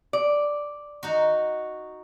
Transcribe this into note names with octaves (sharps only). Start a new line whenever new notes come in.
D5
D#4 F#4